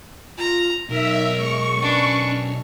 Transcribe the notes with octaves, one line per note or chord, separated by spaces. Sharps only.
F4 A#5
B1 D#4 A#4 E5
G#3 C#6
C#4 D4 B4